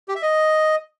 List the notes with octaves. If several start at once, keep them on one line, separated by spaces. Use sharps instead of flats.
G4
E5
D#5